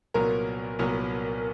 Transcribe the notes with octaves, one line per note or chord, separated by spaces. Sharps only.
C2 A#2 F#3 B3 A#4
C2 A#2 F#3 B3